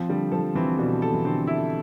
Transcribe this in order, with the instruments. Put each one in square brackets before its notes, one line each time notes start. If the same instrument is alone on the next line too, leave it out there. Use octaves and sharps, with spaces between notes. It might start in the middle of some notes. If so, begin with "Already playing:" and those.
Already playing: [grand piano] F3 [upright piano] C4
[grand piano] D3 [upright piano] G3
[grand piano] F3 [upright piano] A4
[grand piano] E3 [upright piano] C4
[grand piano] B2 [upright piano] G3
[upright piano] A4
[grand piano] E3
[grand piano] D3 [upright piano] C4
[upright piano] E4